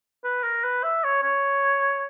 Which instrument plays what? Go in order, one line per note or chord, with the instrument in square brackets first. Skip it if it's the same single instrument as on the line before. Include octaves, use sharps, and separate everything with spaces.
[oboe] B4
A#4
B4
E5
C#5
C#5